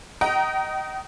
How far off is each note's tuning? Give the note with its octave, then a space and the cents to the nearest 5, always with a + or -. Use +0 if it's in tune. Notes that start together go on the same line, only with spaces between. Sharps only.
D#5 +0 G5 -35 A#5 +0